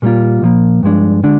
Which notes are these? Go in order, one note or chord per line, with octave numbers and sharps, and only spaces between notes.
A#2 G3 A#3 F4
A#2 F3 A#3
G2 F3 G#3 D4
D3 G#3 D4